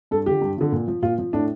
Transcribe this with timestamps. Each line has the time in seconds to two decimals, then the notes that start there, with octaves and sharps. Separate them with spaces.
0.11 G2 A4
0.26 D3 F3 G4
0.42 G2
0.58 D3 F3
0.72 A#2
0.88 F3
1.02 A#2 F4
1.18 F3
1.33 A2 D4